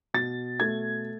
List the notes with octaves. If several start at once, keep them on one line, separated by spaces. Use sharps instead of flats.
B2 A6
A3 G#6